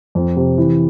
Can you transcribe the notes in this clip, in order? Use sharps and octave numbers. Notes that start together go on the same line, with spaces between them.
F2
C3
E3